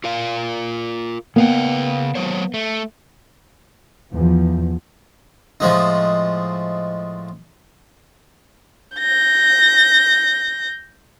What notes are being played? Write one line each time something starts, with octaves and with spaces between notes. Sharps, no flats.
F4 A#4 F5
C#3 A#3 B3 F5 G5
F#3 C5 C#5
A3
E2 F3
A2 F3 G#3 D#4
G6 A#6